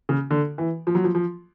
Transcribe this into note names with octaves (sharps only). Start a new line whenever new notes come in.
C#3
D3
E3
F3
F#3
F3
F3